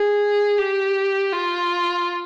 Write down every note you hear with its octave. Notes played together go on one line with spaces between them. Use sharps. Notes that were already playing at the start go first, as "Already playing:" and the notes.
Already playing: G#4
G4
F4